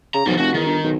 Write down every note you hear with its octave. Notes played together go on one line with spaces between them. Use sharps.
C#3 A#5
B1 F3 G3
F1 F#4
E2 D#3
G1
B1